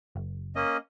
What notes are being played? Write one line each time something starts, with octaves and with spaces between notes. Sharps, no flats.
F#1
A#3 C#4 D#5